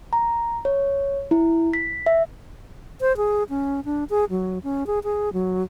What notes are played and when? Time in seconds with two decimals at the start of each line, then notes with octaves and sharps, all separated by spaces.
0.13 A#5
0.65 C#5
1.31 E4
1.73 B6
2.06 E5
3.01 C5
3.17 G#4
3.50 C#4
3.85 D4
4.10 G#4
4.30 F#3
4.64 C#4
4.87 G#4
5.04 G#4
5.33 F#3